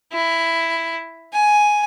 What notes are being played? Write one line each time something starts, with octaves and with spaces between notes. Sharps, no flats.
E4
G#5